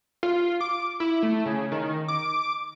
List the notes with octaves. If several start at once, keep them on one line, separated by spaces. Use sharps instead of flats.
F4
D6
E4
A3
C#3
D#3
D6